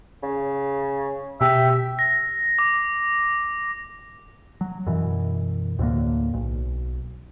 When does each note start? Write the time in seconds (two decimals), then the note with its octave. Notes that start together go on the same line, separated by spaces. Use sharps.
0.23 C#3
1.41 B2 G4 E5
1.99 A#6
2.59 D6
4.61 F#3
4.87 F#2 B2 E3
5.79 D2 A2 D3 A#3
6.34 B1